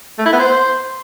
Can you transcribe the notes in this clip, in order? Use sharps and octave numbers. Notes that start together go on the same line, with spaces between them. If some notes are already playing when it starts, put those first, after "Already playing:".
A3
E4
B3
C5